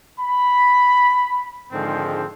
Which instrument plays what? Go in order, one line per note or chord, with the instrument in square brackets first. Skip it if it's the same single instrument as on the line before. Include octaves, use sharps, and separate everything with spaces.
[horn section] B5
G#2 D3 D#3 F3 G#3 C4